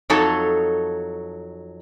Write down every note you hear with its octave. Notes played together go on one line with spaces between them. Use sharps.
F2 F#3 D#4 A4 C#5 A5